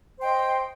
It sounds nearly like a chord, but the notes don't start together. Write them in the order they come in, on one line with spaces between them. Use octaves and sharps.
C5 G5 D#5